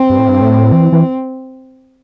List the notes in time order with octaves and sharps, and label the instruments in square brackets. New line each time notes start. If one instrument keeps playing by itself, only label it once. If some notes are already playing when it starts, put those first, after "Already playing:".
Already playing: [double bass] C4
[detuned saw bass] G2
A2
G2
A2
E3
E3